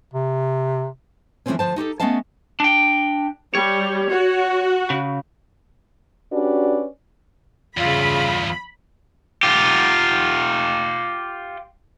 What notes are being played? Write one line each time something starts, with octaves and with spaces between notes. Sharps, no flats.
C3
E3 F3 G#3 A3 C4 C#4
D2 B2 F3 C5 A5
D#4 F#4 G4 A4
A3 B3 C#4 D#5 F5 A5
D4 G5
G3 C#5
F#4
C#3
C#4 D4 F#4 G4 B4 D5
E2 G2 C#3 F4 B5
F4 G4